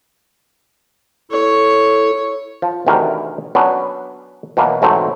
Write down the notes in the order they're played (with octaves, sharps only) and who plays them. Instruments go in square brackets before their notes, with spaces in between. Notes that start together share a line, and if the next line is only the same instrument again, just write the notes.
[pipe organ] E4 A4 [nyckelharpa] C#5
[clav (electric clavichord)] F3
D2 C3 D#3 E3 A#4
F#3 B3 C#4 D4
B2 E3 F#3 A#3
G#2 E3 F#3 A3 C4